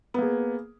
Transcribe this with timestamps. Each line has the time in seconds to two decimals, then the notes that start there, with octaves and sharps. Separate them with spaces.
0.14 B3
0.18 A#3
0.22 G#4